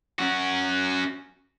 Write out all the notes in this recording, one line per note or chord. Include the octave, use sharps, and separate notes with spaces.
C#4 F#4